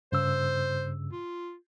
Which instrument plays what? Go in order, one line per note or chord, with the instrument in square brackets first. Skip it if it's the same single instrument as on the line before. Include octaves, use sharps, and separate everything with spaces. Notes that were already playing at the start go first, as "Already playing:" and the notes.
[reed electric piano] G2 C#3 E6 [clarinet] C5
[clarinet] F4